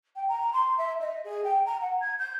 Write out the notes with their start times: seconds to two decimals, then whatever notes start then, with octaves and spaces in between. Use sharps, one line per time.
0.16 G5
0.29 A#5
0.53 C6
0.78 E5
1.01 D#5
1.24 G#4
1.44 G5
1.66 A#5
1.81 F#5
2.01 G#6
2.19 G6